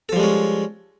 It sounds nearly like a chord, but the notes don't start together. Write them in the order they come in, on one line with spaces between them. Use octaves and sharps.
A4 F3 G3 G#3 C#4